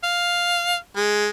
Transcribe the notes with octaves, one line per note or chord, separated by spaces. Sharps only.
F5
G#3